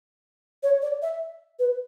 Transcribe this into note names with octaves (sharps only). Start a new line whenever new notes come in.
C#5
D5
E5
B4